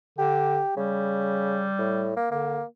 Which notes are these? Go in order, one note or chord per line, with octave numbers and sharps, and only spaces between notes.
D3 G4
C#3 G3
A2
A#3
D3 A#3